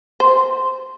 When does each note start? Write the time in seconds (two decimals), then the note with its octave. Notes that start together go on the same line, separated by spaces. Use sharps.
0.20 C5